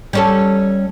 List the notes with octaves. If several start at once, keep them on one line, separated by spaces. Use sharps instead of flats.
G3 C#4 A4